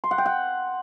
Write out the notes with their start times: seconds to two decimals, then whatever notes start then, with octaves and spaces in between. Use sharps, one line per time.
0.04 C6
0.11 F#5
0.18 G5
0.26 F#5